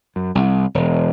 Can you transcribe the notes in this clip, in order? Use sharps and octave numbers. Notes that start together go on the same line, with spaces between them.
F#2
C2
E1